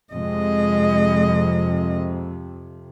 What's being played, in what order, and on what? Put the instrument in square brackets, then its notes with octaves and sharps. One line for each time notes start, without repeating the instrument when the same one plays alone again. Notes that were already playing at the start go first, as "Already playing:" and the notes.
[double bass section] F2 C3 [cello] G#3 D#5